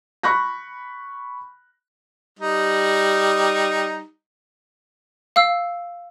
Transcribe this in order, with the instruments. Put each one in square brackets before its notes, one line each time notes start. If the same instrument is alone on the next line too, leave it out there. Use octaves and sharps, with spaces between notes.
[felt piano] B5 C#6 F#6 A#6
[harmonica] G3 D#4
[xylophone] F5 E6